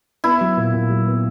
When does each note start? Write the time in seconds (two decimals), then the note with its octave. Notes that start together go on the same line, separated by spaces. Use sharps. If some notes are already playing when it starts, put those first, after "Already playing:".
0.24 B3 E4
0.41 F#3
0.57 A#2
0.74 A#2
0.90 F#3
1.06 B3